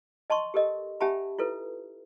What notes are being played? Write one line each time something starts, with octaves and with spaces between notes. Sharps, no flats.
D#5 A5 C6 C#6
G4 A4 A#4 D#5
C#4 G4 E5 G#5 A5 B5
E4 F4 A4 B4